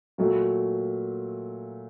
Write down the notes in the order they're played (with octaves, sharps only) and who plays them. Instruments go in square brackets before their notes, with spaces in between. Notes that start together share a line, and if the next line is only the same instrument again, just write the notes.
[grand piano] A#2 F#3 A3